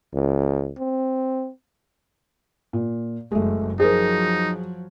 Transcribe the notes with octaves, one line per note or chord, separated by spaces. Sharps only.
C#2
C4
A#2
F#1 G#3 A3
F3 F#3 D#4 G#4 A#4 C5